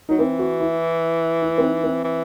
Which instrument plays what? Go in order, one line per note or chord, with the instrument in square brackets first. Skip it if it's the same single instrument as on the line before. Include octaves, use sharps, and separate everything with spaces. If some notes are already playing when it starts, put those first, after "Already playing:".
[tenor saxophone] F#3 [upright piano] D#4
[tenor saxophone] E3 [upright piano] C4
[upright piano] F#4
E4
E4
C4
D#4
C4
[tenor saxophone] E3